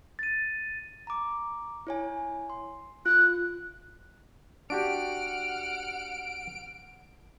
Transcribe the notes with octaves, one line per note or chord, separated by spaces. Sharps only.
A6 D#7
A#5 D6
E4 C#5 G#5
C6
F4 F#6
D4 F#4 G4 F#5 F6 D7